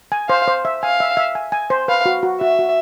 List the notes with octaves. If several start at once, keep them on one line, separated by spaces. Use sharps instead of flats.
G#5
C5 F5
C5
E5
F5 G#5
E5
E5
G#5
G#5
C5
B4 F5
F#4
F#4
F#4 E5
F#4